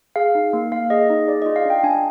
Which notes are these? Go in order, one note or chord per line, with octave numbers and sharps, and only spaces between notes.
G#4 F5
D#4
A#3
A#3 F5
G#4 D#5
D#4
G#4 D5
F4 D#5
F5
D4 G5
D4 G#5